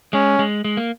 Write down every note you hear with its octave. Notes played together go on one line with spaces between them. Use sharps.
G#3 C#4
G#3
G#3
A#3